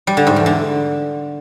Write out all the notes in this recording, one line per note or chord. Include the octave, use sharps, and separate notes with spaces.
G3
D3
G#2
E2
D3